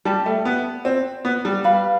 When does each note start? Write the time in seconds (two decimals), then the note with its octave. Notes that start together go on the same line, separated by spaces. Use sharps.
0.05 G3 G4 D5 A5
0.26 A3
0.45 B3
0.85 C4
1.25 B3
1.45 G3
1.64 B4 F5 B5